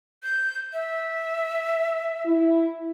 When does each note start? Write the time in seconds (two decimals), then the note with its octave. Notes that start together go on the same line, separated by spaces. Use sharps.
0.23 G6
0.73 E5
2.26 E4